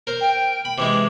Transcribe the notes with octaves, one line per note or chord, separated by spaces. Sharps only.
A#4 C5
G5
B5
C3 E3 G#3 D6